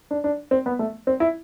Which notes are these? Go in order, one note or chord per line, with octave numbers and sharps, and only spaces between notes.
D4
D4
C4
B3
A3
C4
E4